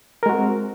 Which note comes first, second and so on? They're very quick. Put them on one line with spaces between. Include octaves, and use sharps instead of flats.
A#4 G#3 F#4 C4